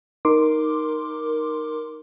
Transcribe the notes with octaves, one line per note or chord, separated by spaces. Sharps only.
D#4 A#4 C6 D6